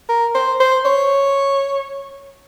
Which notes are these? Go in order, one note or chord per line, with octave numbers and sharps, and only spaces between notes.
A#4
C5
C5
C#5